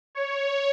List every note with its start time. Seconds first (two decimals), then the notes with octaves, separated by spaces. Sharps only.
0.15 C#5